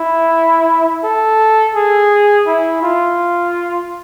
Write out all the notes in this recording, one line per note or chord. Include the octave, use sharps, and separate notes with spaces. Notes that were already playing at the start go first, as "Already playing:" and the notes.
Already playing: E4
A4
G#4
E4
F4